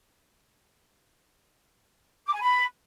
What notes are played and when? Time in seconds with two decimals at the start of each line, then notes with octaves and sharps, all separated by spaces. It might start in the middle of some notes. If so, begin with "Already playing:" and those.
2.25 D6
2.33 G#5
2.40 B5